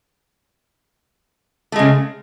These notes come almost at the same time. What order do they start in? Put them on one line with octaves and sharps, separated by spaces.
A3 G#3 C#3